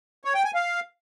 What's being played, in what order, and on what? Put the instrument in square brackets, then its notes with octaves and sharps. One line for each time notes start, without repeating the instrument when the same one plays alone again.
[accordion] C#5
G5
G#5
F5